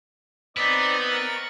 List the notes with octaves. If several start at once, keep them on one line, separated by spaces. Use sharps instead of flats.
B3 C4 D#4 D5
A#4 C#6 A6